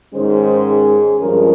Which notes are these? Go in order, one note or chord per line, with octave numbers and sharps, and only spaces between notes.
G#2 D#3 G#3 C#4 C5
G#4
G2 F3 G#3 C#4 A#4